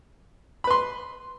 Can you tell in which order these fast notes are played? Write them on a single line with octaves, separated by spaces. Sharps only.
B5 B4 C6